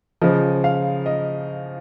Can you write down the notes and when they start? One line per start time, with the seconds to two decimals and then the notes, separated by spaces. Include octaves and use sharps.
0.22 C#3 F3 D#5
0.64 F5
1.06 D#5